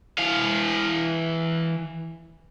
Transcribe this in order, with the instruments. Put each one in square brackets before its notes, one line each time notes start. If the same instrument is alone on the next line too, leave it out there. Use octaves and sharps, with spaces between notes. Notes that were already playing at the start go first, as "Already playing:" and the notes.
[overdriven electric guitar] E3 F5